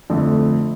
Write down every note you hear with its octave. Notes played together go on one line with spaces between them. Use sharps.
F2 D3 A3